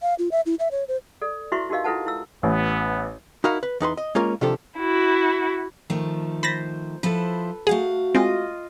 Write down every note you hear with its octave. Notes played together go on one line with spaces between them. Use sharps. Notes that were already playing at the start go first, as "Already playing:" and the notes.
F5
F4
E5
E4
E5
C#5
C5
A4 D5
E4 F#4 B4 E5 C6 C#6
D#4 F#4 G4 A#4 D#5 F5
E4 F4 A4 B4 F#5 A5
E4 E6
A1 B3
D#4 E4 F#4 A#4 F5
B4
E2 D#4 B4 C6
D#5
G#3 A#3 C#4 F4 A#4
C3 D#3 F3 D4 G4 A4
E4 F#4
D#3 F3 A3
C5 B5 A6 A#6
F3 E4 A4 B4 C5
A3 F#4 G#4 F5 F#5
G#3 C4 F4 D#5